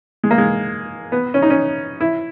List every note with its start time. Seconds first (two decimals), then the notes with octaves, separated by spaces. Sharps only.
0.23 G#3
0.31 A#3
0.38 G#3
1.12 B3
1.34 C#4
1.42 D#4
1.50 C#4
2.01 E4